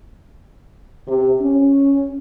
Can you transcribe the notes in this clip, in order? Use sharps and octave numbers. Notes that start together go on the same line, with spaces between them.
C3
C#4